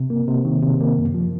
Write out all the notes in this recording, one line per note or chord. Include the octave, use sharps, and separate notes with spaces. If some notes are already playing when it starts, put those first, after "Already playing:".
Already playing: C3
A#3
C3
D#3
C3
A#3
F#2
F3